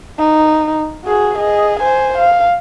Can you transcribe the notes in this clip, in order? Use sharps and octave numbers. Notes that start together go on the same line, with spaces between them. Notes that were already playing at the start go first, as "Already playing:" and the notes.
D#4
F#4 G#4
G#4 D#5
C5 G#5
F5